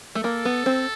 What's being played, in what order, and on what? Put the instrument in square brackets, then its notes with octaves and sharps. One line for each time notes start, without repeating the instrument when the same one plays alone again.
[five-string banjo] A3
[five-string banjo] A#3 [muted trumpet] A4
[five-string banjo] B3
C4